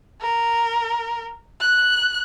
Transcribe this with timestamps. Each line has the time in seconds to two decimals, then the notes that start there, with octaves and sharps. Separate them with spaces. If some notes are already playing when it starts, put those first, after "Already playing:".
0.22 A#4
1.61 F#6